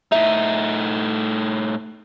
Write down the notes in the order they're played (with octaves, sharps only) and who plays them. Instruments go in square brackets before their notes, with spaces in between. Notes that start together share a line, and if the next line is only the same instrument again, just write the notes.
[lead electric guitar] A2 D#4 [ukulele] E5